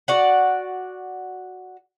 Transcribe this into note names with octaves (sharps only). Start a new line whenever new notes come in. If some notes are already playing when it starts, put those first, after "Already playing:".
F#4 D5 F#5